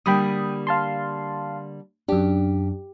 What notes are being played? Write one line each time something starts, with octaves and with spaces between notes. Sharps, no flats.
D3 G3 A#3 G5 B5 D#6
F5 A5 C6
F#2 D4 G4